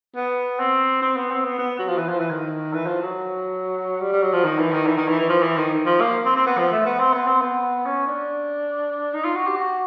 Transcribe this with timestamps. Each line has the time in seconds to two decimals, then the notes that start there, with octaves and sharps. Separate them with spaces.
0.16 B3
0.59 C4
1.02 C4
1.17 B3
1.30 C4
1.45 B3
1.59 B3
1.79 F#3
1.88 F3
1.98 E3
2.09 F3
2.20 E3
2.30 D#3
2.73 E3
2.87 F3
3.02 F#3
4.01 G3
4.12 G3
4.22 F#3
4.33 F3
4.44 D#3
4.59 E3
4.73 D#3
4.86 E3
4.97 D#3
5.08 E3
5.19 E3
5.29 F3
5.43 E3
5.57 D#3
5.86 F3
6.01 A#3
6.25 C4
6.36 C4
6.46 B3
6.58 F3
6.72 A3
6.86 B3
6.99 C4
7.13 B3
7.27 C4
7.41 B3
7.86 C#4
8.07 D4
9.14 D#4
9.24 F4
9.35 F#4
9.47 G4
9.57 F#4